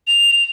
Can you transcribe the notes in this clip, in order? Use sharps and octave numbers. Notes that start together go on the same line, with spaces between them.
F7